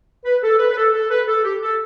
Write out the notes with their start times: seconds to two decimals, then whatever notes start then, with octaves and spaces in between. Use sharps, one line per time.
0.24 B4
0.42 A4
0.58 B4
0.71 B4
0.76 A4
0.93 A4
1.10 B4
1.27 A4
1.44 G4
1.62 A4